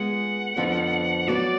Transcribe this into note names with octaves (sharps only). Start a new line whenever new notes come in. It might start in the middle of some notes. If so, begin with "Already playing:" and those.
Already playing: G#3 B3 F4 G#4 F#5
F2 D3 F3 B3 F4
F#3 B3 F#4 D5